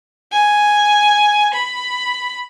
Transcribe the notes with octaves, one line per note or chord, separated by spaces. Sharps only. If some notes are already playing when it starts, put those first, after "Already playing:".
G#5
B5